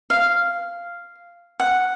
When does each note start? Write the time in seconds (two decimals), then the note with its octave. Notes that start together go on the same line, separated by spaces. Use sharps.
0.10 F5
1.60 F#5